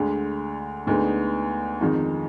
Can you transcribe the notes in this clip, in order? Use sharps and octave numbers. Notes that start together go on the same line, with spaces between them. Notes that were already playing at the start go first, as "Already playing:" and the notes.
Already playing: D2 D3 G#3
D2 D3 G#3 B3 D#4
F2 D#3 G#3 D#4